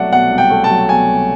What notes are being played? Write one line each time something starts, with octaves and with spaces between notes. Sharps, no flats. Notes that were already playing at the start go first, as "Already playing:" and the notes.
Already playing: C2 B2 F#3 A3 D5 E5 F#5
B2 F#5
C2
G5
A3
A5
F#3
B2 G#5
C2